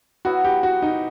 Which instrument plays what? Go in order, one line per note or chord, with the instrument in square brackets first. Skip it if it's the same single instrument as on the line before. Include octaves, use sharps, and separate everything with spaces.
[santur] F#3 B3 E4 [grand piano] F#4
[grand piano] G4
F#4
D#4